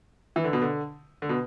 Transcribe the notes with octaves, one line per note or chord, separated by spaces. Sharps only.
E3
D3
B2
D3
D3
B2